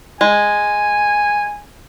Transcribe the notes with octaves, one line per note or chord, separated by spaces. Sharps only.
G#3 G#5